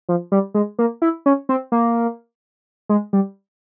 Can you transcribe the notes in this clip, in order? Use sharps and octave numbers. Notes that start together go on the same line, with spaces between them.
F3
G3
G#3
A#3
E4
C#4
C4
A#3
G#3
G3